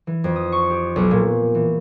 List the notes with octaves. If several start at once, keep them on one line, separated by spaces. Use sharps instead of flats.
E3
F2
D#6
C#6
G4
B1
A#2
E3